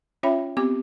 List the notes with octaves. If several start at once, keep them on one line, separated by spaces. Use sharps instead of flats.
C#4 F4 C#5 E5 G5 B5
B3 C4 G4 D6